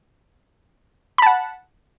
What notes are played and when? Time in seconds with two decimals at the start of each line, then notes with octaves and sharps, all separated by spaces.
1.18 B5
1.22 A5
1.26 F#5